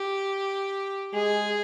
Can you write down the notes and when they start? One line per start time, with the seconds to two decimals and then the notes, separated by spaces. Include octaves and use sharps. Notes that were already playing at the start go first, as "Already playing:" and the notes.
Already playing: G4
1.14 G#3 G#4